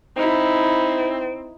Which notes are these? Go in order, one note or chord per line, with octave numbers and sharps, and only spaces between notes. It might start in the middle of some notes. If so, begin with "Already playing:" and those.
C4 D#4 E4